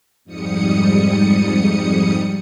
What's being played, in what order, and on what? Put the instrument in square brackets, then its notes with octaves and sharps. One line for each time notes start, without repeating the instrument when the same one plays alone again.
[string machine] F2 G#2 G3 D#6 C#7